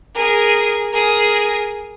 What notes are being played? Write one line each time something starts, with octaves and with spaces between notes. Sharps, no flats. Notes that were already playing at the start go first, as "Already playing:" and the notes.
G#4 A#4
G#4 A#4